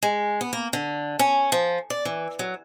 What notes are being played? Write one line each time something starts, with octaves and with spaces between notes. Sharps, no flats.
G#3
B3
A#3
D3
C#4
F3
D5
E3
F#3